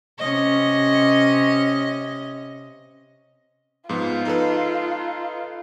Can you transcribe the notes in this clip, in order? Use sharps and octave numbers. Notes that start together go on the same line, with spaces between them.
C3 C#4 D#5
G#2 F3 B3 F4
D#4 A4 B4